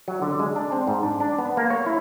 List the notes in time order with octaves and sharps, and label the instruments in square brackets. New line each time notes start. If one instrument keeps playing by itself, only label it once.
[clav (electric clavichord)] F#3
D3
G#3
D4
C4
G#2
D4
D4
B3
A#3
C#5
E4